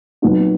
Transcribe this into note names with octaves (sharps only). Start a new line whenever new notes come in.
A#2 F#3 B3 D#4 F#4